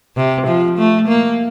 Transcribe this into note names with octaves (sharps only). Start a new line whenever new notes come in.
C3
F3
A3
A#3